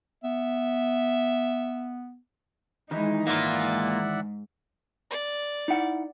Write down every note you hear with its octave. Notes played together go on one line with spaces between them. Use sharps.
B3 E5
D#3 E3 G#3 D#4 E4
G#2 A#3 F4 D5 E5 F#5
D5
D#4 E4 F#5